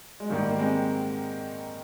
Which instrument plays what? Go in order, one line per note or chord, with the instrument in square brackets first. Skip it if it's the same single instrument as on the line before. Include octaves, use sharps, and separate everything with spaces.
[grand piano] G#3
G#2 D#3 G3 A#3
A#3
G#3 C4